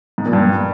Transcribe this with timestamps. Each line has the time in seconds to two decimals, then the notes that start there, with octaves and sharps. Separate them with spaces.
0.18 G#2
0.26 A#2
0.33 G2